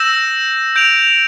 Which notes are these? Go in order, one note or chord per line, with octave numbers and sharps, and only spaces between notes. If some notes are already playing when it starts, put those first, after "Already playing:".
Already playing: E6 G6 A#6 E7
G6 D7 F7